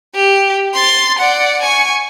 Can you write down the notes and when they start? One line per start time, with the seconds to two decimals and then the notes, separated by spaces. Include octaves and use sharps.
0.15 G4
0.74 C6 A6
1.19 D5 F#5
1.62 G#5 C#6